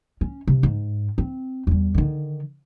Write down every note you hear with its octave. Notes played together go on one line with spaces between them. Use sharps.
C#4
C3
G#2
C4
E2 G3
D3 D#3